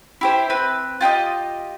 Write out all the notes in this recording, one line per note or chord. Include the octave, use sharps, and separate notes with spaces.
E4 G4 C5
C4 B4
F4 G4 A4 D#5